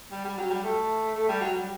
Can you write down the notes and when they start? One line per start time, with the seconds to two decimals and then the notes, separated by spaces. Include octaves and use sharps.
0.11 G3
0.25 G3
0.38 F#3
0.50 G3
0.64 A3
1.15 A3
1.29 G3
1.41 F#3
1.54 G3